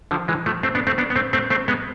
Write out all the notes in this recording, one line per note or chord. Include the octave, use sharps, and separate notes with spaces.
D3 F3
E3 G#3
F3 A3
A3 C4
B3 D4
A3 C4
B3 D4
B3
A3 C4
A3 C4
A3 C4
G#3 B3